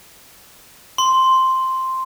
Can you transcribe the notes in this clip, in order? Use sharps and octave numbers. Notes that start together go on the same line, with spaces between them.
C6